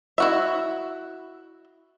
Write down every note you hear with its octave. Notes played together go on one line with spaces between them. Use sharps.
E4 F#4 E5